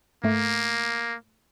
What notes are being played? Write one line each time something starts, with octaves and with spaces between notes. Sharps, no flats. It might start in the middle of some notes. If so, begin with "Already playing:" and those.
G#2 A3 A#3